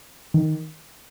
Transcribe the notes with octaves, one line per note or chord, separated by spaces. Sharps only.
D#3